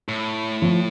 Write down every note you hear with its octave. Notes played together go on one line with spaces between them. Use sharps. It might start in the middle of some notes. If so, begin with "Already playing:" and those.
A2
F3